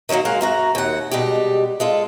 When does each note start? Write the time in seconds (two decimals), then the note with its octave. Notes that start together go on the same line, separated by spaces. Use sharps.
0.09 D#3 F#3 G3 A#3 F#4
0.25 G#3 A#3 F5 F#5
0.41 F#2 F#4 A#5
0.75 D#2 F#5
1.11 B2 G3 G#3 G4
1.80 G#3 F4 A4